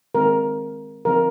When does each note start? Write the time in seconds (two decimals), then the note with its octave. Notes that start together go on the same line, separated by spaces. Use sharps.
0.15 D#3 G#3 C4 A#4
1.05 D3 F3 C4 A#4